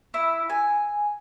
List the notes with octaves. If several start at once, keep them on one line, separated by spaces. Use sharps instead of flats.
E4
G#5